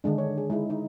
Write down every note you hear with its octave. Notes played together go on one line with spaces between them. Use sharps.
D3 D#3 G#3 D4
C#5
G#4
G#3 D#4 E4
D#4